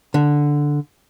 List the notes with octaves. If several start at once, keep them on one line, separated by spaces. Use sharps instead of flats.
D3